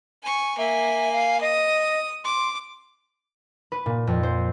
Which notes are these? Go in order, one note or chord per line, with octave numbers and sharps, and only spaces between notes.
G#5 C#6
A#3 E5 G#5
F5
D#5 D#6
C6 D6
B4
A#2
F2
C5